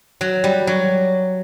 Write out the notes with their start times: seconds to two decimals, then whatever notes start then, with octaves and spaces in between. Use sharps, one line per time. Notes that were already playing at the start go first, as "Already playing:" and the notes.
0.21 F#3
0.44 G3
0.67 F#3